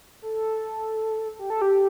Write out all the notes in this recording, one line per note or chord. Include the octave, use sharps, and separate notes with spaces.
A4
G4
A4
G4